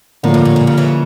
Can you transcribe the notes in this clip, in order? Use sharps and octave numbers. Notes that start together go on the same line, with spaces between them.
A2 D3 F3 A#3
G2
A2
A#2
C#3
C#3 E3